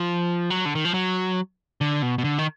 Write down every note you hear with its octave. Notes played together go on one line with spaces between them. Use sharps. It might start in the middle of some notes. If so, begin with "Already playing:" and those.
Already playing: F3
F#3
D3
D#3
F3
F#3
D3
B2
B2
D3
D#3